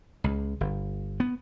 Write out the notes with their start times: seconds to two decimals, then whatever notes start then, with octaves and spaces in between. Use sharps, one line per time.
0.24 C#2
0.61 G1
1.20 B3